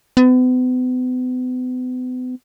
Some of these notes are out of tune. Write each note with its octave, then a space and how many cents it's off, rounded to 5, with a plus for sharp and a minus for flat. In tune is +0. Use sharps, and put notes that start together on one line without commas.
B3 +40